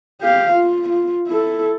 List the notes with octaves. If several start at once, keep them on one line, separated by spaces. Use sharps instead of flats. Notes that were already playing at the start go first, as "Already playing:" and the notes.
G4 F5
F4
F4
E4 A4